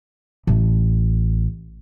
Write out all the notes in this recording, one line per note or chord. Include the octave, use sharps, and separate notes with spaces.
A1